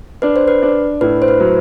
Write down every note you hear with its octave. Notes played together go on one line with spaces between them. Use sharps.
D4 B4
C5
B4
D4
A2 B4
C5
B4
F#3